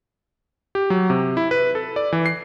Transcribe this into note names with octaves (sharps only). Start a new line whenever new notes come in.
G4
F#3
C3
E4
B4
A4
D5
E3
C7